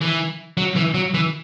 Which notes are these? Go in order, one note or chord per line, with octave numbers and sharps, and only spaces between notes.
E3
F#3
E3
F#3
E3